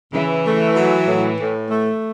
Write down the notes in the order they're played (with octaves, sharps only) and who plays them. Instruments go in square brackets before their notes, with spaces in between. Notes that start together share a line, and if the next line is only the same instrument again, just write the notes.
[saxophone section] C#3 [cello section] E3
[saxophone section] A3
F#3
A2
A2
A3